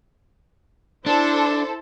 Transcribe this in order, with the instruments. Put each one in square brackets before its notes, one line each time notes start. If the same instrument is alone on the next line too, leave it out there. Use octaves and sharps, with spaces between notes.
[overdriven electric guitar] D4 [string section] E4 A4 C5